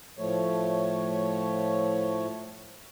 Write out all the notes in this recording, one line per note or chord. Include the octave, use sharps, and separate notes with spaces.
A2 F3 A3 C#5